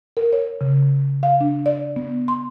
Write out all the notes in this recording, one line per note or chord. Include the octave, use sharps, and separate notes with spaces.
A#4
C#5
C#3
F5
D4
D5
B3
C6